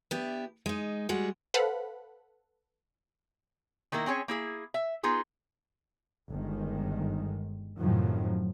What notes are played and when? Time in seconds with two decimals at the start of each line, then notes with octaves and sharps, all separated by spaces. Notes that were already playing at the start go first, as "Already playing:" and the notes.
0.11 B3 D4 E4 G4
0.66 G#3 D#4
1.09 G3 G#3 F#4
1.54 A4 B4 C5 F5 F#5 B5
3.92 D#3 A#3 E4 A#4
4.06 C4 C#4 G#4 C#5
4.28 A#3 E4 G#4
4.74 E5
5.03 B3 D#4 F4 G#4
6.30 G1 D#3 G#3
7.78 F#2 A2 C3 D#3 F3 F#3